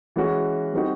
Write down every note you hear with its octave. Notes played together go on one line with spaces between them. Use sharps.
E3 G#3 C#4 F#4
G3 C4 D#4 F#4